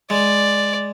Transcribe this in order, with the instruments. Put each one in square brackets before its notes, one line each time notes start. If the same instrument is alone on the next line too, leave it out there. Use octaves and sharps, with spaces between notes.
[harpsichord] G#3 [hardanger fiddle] D5